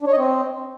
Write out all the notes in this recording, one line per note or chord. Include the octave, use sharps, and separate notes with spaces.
D4
C#5
D#5
C4